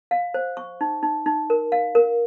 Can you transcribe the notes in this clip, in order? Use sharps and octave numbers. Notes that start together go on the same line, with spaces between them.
F5
C5
C#6
D#4
D#4
D#4
A#4
F5
A#4